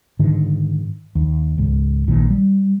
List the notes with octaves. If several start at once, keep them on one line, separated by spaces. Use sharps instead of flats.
G#2 D3 D#3
D#2
C#2 G#2
A#1 A#2 D#3
G3